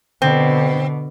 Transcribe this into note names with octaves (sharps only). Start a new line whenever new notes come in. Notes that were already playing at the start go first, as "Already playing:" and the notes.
B2 D3 C4